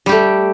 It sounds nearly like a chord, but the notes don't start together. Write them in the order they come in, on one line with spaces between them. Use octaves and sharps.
G3 G4 A3